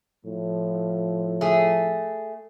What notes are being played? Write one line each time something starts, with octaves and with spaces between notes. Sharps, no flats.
A2 F3
A3 G#4